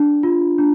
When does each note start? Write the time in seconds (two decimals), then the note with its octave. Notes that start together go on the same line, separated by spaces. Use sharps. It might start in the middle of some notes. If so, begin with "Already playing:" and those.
Already playing: D4
0.23 F4
0.58 D4